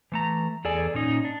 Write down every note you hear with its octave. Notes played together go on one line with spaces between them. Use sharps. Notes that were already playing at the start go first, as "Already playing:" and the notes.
E3 A3 A#5
E2 G#4 A4 D5 G#5
A#2 C#4 D#4
D4